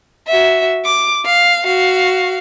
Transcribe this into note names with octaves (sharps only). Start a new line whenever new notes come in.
F#4 E5
D6
F5
F#4 F5